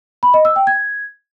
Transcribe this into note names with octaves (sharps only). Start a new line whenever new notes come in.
B5
D#5
E6
G5
G#6